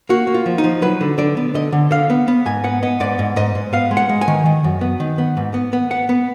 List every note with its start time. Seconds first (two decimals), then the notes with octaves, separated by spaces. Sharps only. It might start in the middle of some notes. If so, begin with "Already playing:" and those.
0.09 A#3 F#4
0.27 A#3
0.34 F4
0.46 F3
0.58 D#4
0.64 F3
0.82 F#3 B4
1.01 D3
1.18 D3 D5
1.37 B3
1.54 D3 D#5
1.72 D3
1.91 D3 F5
2.10 B3
2.28 B3
2.46 G#2 G#5
2.64 B3 F#5
2.83 B3 D#5
3.00 G#2 D5
3.19 G#2
3.36 G#2 D#5
3.55 G#2
3.73 B3 F5
3.91 G#3
3.97 F#5
4.09 G#3
4.21 G#5
4.28 D#3
4.46 D#3
4.64 F#2
4.81 B3
5.00 D#3
5.18 B3
5.37 G#2
5.54 B3
5.73 B3
5.91 B3 F#5
6.09 B3